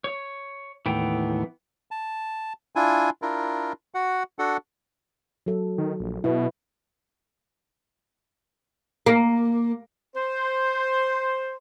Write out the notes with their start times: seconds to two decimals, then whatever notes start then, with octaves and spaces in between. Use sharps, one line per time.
0.04 C#5
0.86 D#2 A2 E3 B3 G5
1.91 A5
2.76 D4 E4 F4 G#5
3.22 D4 E4 F4 A#4
3.94 F#4 F#5
4.39 D4 F#4 A4 F#5
5.46 F#3 A4
5.78 D#3
6.00 A#1
6.24 B2 E4 B4
9.06 A#3
10.15 C5